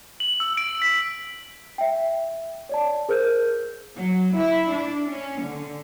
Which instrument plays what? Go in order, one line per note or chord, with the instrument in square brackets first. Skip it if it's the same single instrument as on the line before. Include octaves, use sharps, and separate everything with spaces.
[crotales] F#7
E6
D7
B6
[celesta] E5 G5
C#5 D5 A5
G#4 A#4 C5 F6 G6
[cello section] F#3
E4
D4
C#4
D3